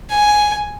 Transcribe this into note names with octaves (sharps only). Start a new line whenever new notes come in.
G#5